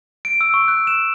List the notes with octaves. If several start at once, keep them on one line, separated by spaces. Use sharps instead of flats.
D7
E6
C#6
F#6
E7